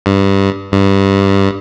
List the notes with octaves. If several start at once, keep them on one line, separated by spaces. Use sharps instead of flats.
G2
G2